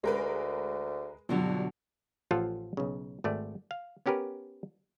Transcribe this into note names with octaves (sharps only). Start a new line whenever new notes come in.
D2 G#3 A#4 B4
G2 B2 D3 F3 F#3
A1 F3 F4 A4 F5 F#5
B1 C#3
G#1 A3 D5
F5
B3 C#4 G4 A#4 B4